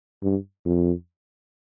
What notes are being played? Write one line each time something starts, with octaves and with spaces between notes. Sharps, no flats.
G2
F2